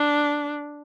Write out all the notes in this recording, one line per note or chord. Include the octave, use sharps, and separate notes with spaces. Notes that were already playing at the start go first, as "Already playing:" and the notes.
Already playing: D4